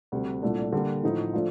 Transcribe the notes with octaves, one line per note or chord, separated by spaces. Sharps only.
D2 C3 G3
C2 A#2 A3 D4
D3 G3 A#3
A1 A2 F3 A3 D#4
F3 A3 D4 F4